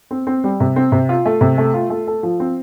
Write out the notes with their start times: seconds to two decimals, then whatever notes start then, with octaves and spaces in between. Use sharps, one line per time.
0.11 C4
0.27 C4
0.44 G3
0.60 C3
0.76 C4
0.92 C3
1.09 F4
1.25 A3
1.41 C3
1.58 A3
1.74 F4
1.90 A3
2.07 A4
2.23 F3
2.40 C4